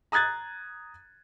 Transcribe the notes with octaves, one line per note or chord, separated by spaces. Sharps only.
A#5 D#6 F#6 G#6 A6